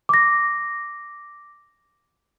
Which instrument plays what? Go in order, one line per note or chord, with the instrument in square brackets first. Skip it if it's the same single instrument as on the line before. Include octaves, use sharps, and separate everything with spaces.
[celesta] D6 A#6